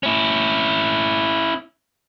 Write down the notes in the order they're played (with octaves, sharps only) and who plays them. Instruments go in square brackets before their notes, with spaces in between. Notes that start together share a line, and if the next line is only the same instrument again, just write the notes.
[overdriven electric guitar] C#4 E4